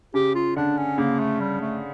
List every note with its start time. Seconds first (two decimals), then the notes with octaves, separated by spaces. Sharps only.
0.14 C#3 G4
0.35 F4
0.56 D3 D4
0.77 C#4
0.98 C#3 A#3
1.19 A3
1.40 G3
1.61 A3